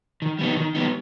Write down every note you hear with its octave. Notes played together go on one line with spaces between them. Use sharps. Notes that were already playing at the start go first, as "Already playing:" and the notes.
D#3
G3 B3 D#4
D#3
G3 B3 D#4